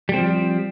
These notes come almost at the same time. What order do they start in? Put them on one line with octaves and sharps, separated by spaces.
G3 C4 F3